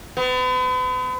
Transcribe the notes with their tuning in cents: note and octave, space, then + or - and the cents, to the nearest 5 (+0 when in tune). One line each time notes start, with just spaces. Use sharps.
B3 +40